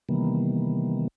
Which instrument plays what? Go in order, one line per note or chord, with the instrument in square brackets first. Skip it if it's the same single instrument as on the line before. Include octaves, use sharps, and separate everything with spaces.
[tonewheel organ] C3 D#3 E3 G3 A#3 B3